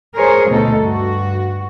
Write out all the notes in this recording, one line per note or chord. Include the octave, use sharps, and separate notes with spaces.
G#4 A#4 C5 C#5
D2 B2 D#4 A4
G2 F#4